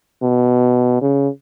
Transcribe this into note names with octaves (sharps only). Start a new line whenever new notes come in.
B2
C#3